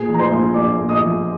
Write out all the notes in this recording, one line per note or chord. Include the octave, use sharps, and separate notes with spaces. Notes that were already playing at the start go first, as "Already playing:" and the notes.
Already playing: A#2 G#4 G#5
F3
A#5
C5 C6
A#1
A#1 D5 D6
A#2
D#5 D#6
F3